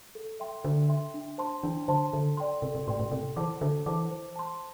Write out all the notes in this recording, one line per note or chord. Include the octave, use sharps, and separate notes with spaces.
A4
E5 G5 C6
D3 A4
E5 G5 C6
D4
C5 A5 C6
E3 D4
D3 C5 A5 C6
D3 A4
D5 G5 C6
C3 A4
C3
A2 D5 G5 C6
A2
C3 A4
E3 C5 A5 D6
D3 A4
E3 C5 A5 D6
C5
A5 C6